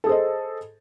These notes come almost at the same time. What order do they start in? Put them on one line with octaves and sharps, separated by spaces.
A4 G#4 C5 D#5